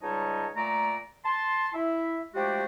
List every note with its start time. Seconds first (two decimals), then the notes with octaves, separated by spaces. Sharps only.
0.03 C#2 G3 D#4 C#5 D#5 A5
0.56 A#2 A3 D5 A#5
1.25 A5 C6
1.74 E4 E5
2.35 F3 G#3 A3 D4 F#4 G4